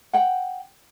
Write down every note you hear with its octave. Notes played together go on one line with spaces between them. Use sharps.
F#5 G5